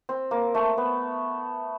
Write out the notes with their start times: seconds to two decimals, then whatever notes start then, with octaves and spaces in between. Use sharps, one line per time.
0.09 C4
0.31 A#3
0.54 A3
0.78 B3